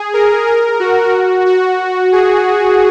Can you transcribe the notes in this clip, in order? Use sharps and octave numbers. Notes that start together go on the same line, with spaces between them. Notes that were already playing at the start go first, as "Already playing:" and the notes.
Already playing: G#4
A#4
A#4
F#4
F#4
G#4